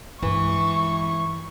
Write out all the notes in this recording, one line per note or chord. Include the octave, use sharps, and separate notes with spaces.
G2 E3 G#3 C#6